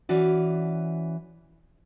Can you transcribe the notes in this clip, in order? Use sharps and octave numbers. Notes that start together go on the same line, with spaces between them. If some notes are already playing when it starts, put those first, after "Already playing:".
E3 C#4 F#4 D5